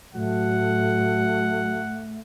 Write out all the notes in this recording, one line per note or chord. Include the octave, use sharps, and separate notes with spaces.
A2 F#3 A3 F#5